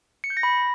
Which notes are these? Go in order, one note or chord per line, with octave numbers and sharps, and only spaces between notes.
C#7
G6
A#6
B5